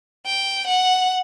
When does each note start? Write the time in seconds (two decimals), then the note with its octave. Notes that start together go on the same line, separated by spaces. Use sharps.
0.26 G5
0.67 F#5